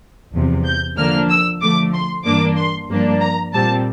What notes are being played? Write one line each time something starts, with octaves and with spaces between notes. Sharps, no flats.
E2 C3 F3
G6
D3 F3 A#3 D4 F6
E6
D3 F3 A3 D6
C6
G2 E3 A#3 D4 D6
C6
G2 F3 A#3 D4
A#5
A#2 G3 C4 A5